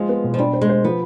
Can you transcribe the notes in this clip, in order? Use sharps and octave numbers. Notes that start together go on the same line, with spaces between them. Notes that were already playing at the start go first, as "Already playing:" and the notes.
Already playing: F3 G#3
B3
B2
F3
G3 D4
C5
G#3
C5
F3 B3